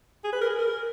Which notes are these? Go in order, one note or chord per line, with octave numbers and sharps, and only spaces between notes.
G#4
B4
A#4
G#4
A#4